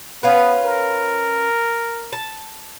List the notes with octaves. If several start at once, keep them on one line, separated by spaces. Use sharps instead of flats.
B3 C#4 F4 B4
A#4
A5